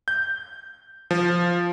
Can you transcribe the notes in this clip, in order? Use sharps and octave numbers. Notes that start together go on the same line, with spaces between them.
G6
F3